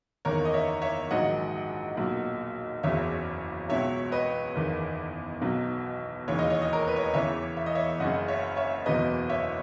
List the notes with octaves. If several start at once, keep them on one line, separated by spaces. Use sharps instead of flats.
F#1 E2 D#3 A#4 C#5
D#5
C#5 E5
C#5 E5
A#1 G#2 D#3 F#3 D#5 F#5
B1 A#2 F#3
F#1 E2 C#3 F#3 C#5 E5
C#2 B2 F#3 C#5 E5
B4 D#5
F#1 E2 D#3
B1 B2 F#3
E1 D#2 C#3 E3 C#5
D#5
C#5
D#5
A#4 C#5
B4
C#5
D#5
E2 C#3 E3 C#5 E5
E5
D#5
C#5 E5
F#1 F#2 C#3 D#5 F#5
C#5 E5
C#5 E5
F#1 E2 B2 F#3 B4 D#5
C#5 E5